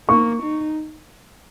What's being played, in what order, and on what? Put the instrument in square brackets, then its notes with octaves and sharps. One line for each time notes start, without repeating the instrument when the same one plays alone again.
[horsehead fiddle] A#3 [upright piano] C#6
[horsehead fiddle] D#4